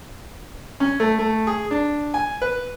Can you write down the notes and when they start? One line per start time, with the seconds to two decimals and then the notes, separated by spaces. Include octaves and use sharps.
0.80 C#4
1.00 A3
1.19 A3
1.47 G#4
1.71 D4
2.14 G#5
2.42 B4